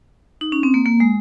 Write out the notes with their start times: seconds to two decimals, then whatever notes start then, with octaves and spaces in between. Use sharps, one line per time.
0.41 D#4
0.52 C#4
0.63 C4
0.74 A#3
0.86 A#3
1.00 G#3